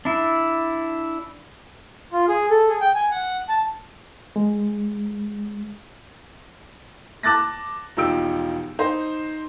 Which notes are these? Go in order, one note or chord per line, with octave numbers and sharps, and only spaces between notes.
D4 E4
F4
G#4
A4
G#4
G5
G#5
F#5
A5
G#3
A5 D6 F#6 A6 A#6
E1 F3 D#4 G4 E6 D7
D#4 C5